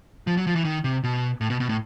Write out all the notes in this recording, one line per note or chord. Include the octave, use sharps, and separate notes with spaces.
F3
F#3
F3
E3
D#3
C3
B2
A2
B2
B2
A2